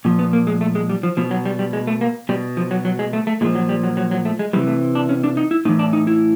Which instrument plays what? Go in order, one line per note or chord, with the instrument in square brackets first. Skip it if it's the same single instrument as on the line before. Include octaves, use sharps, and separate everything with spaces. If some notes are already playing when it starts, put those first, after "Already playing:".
[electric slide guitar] A#2 F3
B3
A#3
G#3
A3
G#3
G3
F3
B2 F3
F#3
G3
G3
G#3
A3
A#3
B2 G3
F3
F#3
F#3
G#3
A3
A3
A#2 G#3
F3
F#3
G3
F#3
F#3
F#3
A3
G#3
C3 E3 G3
A3
D4
C#4
D4
D#4
E4
A2 D#4
E3
D4
D#4
E4